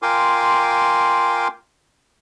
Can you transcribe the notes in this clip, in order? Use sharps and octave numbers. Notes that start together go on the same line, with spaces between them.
F4 A#4 G5 G#5 C6 D6